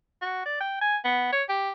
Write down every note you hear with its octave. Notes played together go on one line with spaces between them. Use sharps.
F#4
D5
G5
G#5
B3
C#5
G4